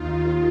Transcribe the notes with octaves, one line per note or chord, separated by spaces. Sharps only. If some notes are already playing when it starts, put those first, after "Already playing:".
Already playing: D#2 D#3 F4